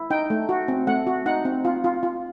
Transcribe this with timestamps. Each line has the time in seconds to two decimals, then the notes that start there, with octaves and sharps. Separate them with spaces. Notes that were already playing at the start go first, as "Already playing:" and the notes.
Already playing: E4
0.10 D#4 G5
0.30 A3
0.49 F#4
0.68 C4
0.87 A3 F#5
1.07 F#4
1.26 D#4 F#5
1.45 C4
1.65 F4
1.84 F4
2.03 F4